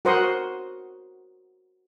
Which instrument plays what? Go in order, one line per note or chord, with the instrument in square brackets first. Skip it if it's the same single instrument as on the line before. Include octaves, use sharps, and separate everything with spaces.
[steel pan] F#4 A#4 C5 F#5 C6 D#6